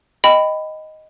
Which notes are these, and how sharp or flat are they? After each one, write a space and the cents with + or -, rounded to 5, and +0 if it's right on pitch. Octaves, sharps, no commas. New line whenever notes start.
D#5 +0 G5 +0 B5 +15